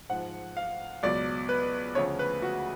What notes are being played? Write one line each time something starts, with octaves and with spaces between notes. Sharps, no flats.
G#2 F3 F#5
F5
C#2 B2 F#3 D5
B4
D2 C#3 F3 C#5
B4
F#4